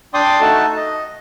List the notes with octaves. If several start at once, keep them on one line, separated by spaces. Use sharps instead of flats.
D4 D5 G5 C6 D6 D#6
A3 D#4 F#4 A4 A5
D#5